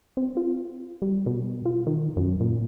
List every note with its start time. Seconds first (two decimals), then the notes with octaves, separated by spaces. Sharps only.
0.17 C4
0.37 F4
1.02 G3
1.26 B2
1.65 F4
1.87 D#3
2.17 F#2
2.40 A#2